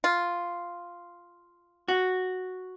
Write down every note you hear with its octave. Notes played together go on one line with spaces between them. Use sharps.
F4
F#4